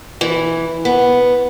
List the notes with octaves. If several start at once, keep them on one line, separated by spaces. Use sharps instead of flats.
E3
B3